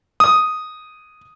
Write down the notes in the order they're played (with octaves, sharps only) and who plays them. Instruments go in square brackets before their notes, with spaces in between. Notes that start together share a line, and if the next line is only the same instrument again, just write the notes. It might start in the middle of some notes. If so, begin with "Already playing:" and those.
[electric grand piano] D#6